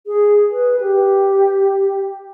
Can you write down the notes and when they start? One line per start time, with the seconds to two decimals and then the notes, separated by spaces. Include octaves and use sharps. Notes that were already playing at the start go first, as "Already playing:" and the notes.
0.06 G#4
0.51 B4
0.80 G4